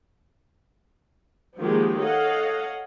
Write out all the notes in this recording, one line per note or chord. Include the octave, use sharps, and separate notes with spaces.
D#3 F3 F#3 G#3 A#3 G4
A4 C#5 D#5 F5 F#5